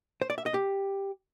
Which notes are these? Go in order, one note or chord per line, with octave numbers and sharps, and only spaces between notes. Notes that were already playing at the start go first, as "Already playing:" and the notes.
C5
D5
E5
D#5
G4